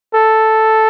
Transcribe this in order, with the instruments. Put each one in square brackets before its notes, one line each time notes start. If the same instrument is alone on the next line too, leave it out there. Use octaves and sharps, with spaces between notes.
[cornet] A4